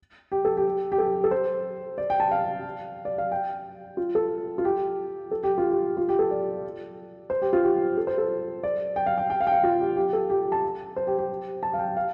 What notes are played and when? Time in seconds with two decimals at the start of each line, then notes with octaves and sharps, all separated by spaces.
0.32 G4
0.45 A4
0.57 G4
0.92 G4
0.98 A4
1.24 A4
1.31 C5
1.98 D5
2.10 G5
2.20 A5
2.31 F5
3.05 D5
3.18 F5
3.32 G5
3.97 F4
4.15 A4
4.58 F4
4.65 G4
5.31 A4
5.43 G4
5.58 F4
5.71 G4
5.97 F4
6.09 G4
6.19 A4
6.31 D5
7.30 C5
7.42 G4
7.53 F4
7.63 G4
7.97 A4
8.07 C5
8.18 A4
8.63 D5
8.96 G5
9.06 F5
9.18 G5
9.30 G5
9.40 F5
9.47 G5
9.52 F5
9.64 F4
9.80 G4
9.96 G4
10.13 A4
10.30 G4
10.52 A5
10.96 C5
11.07 G4
11.19 G4
11.63 A5
11.74 F5
11.79 G5
11.97 F5